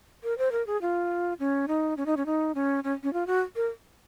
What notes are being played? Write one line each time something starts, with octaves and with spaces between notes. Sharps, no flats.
A#4
C5
A#4
G#4
F4
C#4
D#4
C#4
D#4
C#4
D#4
C#4
C#4
C#4
F4
F#4
A#4